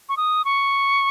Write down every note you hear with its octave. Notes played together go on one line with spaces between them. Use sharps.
C#6
D#6
C#6